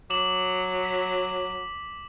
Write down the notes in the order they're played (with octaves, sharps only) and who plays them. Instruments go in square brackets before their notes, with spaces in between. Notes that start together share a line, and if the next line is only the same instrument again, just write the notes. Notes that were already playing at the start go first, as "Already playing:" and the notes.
[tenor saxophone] F#3 [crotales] D6 E7 F#7
[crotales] B6